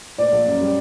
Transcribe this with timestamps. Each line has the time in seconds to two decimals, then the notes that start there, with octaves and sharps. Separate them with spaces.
0.18 A#2 D5
0.32 A#1
0.47 F#2
0.61 G3